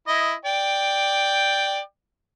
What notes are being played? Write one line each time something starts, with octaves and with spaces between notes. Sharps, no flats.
E4 D#5
D5 G5